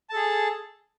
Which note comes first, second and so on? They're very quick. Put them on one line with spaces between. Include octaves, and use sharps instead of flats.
A5 A4 G#4